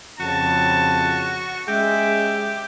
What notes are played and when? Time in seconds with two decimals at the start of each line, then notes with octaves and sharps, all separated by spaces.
0.20 F2 C#3 F#4 A5
1.68 G#3 C#4 G4 G#4 E5